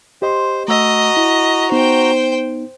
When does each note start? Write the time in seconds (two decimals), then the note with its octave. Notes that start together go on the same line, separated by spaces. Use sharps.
0.22 G4 C5 D#5 C6
0.68 A3 F#4 D#5 A#5 E6
1.17 E4
1.72 B3 D#4 C5 G5